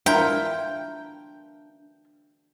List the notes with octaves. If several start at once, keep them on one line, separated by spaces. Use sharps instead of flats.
D4 E4 F4 A#4 G5